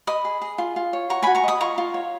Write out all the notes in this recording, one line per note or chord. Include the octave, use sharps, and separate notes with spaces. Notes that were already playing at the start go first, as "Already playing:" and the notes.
D#5 B5 D#6
G#4
G#4
F4
F4
C#5
F#4 A#5 C#6
F#4 G#5 B5
A#5 C#6
D#5 B5 D#6
F4 A#5 C#6
F4
C#5